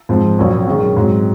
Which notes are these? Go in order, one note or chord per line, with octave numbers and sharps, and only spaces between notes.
G#2 F3 C4
A#1 A#2 F#3 C#4
F#2 D#3 G#3 C#4
G#2 F#3 C4